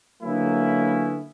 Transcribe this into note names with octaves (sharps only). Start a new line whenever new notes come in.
D3 F#3 A#3 B3 C#4 E4